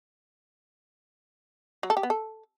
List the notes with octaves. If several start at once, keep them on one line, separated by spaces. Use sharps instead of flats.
F#3
A4
G4
B3
A4